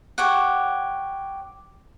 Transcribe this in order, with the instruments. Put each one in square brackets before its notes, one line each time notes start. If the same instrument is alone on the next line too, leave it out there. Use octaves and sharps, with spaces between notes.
[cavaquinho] G4 C#5 F#5